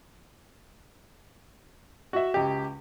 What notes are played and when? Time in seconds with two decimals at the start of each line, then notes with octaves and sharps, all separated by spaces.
2.13 F#4 E5
2.34 C#2 G4